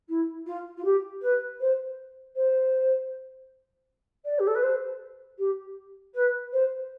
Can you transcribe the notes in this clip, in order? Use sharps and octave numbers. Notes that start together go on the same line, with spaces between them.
E4
F4
F4
G4
B4
C5
C5
D5
G4
A4
B4
C5
G4
B4
C5